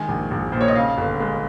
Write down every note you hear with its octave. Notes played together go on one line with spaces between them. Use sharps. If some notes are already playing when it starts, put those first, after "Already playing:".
Already playing: D#3 G#3 G#5
A#1
A#1
A#2 C5
C#5
D#5
C#3 F5
G1
G#3